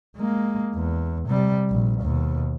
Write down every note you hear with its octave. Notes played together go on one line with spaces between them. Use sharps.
G#3 A#3
E2
C3 G3
A#1
D#2 B2